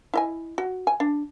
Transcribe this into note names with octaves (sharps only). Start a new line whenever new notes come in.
E4 D#5 G#5
F#4
G#5
D4